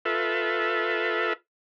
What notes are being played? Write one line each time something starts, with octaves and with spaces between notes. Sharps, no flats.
F4 A4 B4 E5